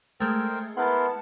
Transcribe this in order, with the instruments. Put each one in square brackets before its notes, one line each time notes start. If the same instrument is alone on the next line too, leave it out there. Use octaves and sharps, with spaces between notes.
[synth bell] G#3 A3 [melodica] A#4 C5 G5
[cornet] B3 [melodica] E4 A#4 C6 [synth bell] F#5 A5